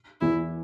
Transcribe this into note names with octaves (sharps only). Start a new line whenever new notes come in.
E2 E4